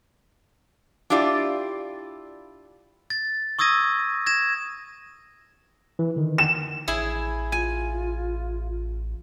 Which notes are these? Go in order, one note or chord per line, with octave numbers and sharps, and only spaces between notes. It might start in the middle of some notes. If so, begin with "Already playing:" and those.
D4 E4 F4 G4 D5
A6
C#6 D#6 E6 G#6 A#6 D#7
G#6 A#6 E7
E3
D3 D#3
E7
A1 E4 G#4
F4 G#5